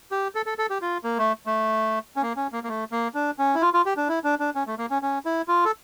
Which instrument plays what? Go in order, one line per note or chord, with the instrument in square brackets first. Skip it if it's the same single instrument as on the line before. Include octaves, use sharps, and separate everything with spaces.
[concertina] G4
A4
A4
A4
G4
F4
A#3
A3
A3
C#4
A#3
C#4
A#3
A#3
A3
A#3
D4
C#4
E4
F4
F4
G4
D4
E4
D4
D4
C#4
A3
A#3
C#4
C#4
E4
F4
A4